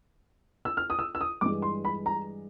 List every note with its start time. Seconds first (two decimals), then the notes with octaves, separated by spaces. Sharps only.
0.65 E6
0.77 F6
0.90 D#6
0.99 E6
1.15 E6
1.21 D#6
1.41 G2 E3 G#3 D6
1.62 C6
1.85 B5
2.06 A#5